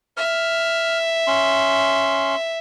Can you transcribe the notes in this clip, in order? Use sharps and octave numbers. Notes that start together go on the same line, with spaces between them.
E5 F6
C#4 C6